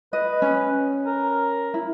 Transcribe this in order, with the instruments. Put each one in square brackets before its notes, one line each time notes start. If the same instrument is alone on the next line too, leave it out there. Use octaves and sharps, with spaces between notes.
[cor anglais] B4 [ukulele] D#5
[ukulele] C#4
[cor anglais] A#4
[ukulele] E4